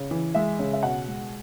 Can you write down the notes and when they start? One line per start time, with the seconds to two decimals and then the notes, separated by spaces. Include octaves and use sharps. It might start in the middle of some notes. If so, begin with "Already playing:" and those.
Already playing: C#3
0.11 E3
0.35 G#3 E5
0.59 C#3
0.73 E5
0.83 B2 F#5
1.08 G#3